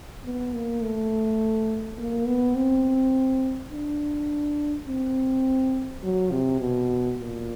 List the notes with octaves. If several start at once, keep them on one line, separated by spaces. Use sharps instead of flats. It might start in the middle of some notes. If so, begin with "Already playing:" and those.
B3
A#3
A3
A#3
B3
C4
D4
C4
F#3
C3
B2
A#2